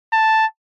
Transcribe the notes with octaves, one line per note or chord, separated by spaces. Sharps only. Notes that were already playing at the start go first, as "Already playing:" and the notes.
A5